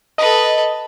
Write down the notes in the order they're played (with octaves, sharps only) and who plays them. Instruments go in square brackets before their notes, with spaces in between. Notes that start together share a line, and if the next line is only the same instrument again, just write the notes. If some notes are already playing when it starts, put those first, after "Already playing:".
[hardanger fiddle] A4 B4 [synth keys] D#5